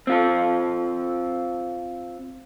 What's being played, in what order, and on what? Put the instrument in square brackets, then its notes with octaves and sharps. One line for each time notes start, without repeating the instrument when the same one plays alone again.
[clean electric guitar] C4 F4 A4